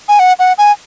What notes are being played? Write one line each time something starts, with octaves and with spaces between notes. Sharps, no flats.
G#5
F#5
F#5
G#5